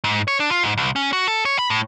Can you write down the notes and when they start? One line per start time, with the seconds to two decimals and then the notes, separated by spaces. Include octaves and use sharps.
0.04 G#2
0.28 C#5
0.40 D4
0.51 F4
0.63 G#2
0.77 C2
0.96 C#4
1.13 F#4
1.27 A4
1.45 C#5
1.59 B5
1.70 A2